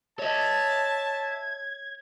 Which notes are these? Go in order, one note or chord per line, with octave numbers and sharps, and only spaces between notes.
C#5 D#5 E5 A5 G#6